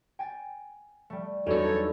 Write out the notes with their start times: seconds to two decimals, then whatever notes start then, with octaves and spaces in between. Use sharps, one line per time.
0.19 G5 G#5 A6
1.10 G3 A3
1.47 E2 F#3 G3 D4 D#4 A4 C#5